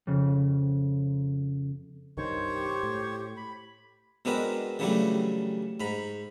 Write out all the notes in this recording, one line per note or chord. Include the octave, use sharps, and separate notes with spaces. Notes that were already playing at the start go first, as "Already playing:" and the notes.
F2 C#3
C2 G2 D#3 C5 C#5 C#6
G4
A2
B5
B2 G#3 C4 D4 A#4 B4
C#3 E3 F#3 G3 A3 D4
G#2 A#5 B5